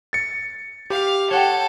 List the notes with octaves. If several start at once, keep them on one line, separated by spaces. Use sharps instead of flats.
A6 C#7
G4 F5
A4 C#5 F#5 G5